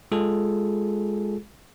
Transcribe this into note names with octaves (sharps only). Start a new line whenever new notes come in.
G#3 F4 G#4 A4